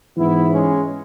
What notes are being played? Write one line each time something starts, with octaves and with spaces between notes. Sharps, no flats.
G#2 E3 B3 E4
G#3 C#4